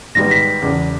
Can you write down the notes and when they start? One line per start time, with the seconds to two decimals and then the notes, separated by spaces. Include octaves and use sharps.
0.15 G#1 G#2 G3 B3 A#6
0.31 B6
0.62 E1 E2 C#3